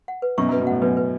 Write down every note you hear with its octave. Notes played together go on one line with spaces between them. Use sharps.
F#5
B4
F#2 B2 C#6
F#2 B4
B2
A2 F#5
F#2 B2 B4
B4